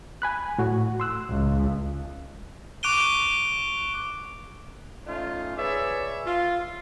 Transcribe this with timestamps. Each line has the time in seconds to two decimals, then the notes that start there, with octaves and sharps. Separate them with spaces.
0.22 G#5 B5 F#6
0.58 A2 F#4
1.00 C6 E6 F#6
1.31 C#2
2.83 C#6 D6 F#6 D7 D#7 G7
5.07 A3 C#4 D#4 F4
5.57 G#4 B4 C#5 D5 E5
6.26 F4